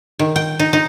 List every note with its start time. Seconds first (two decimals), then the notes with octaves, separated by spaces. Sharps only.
0.19 D#3
0.36 G5
0.59 D#4
0.73 D#4